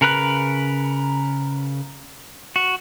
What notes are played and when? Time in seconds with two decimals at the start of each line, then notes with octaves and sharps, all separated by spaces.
0.01 C#3 A#4 B4 F#6
2.56 F#4